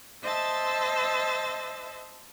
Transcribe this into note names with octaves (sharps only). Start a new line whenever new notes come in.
C5 D#5 E5 A5 E6 A6